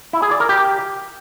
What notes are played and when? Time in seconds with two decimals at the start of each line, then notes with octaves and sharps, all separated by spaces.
0.13 E4
0.22 G#4
0.31 D5
0.40 A#4
0.49 G4